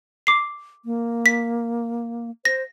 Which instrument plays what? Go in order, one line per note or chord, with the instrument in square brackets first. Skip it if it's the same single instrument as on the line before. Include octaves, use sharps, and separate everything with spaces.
[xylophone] D6 C7
[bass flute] A#3
[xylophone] B6
[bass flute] C5 [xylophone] A#6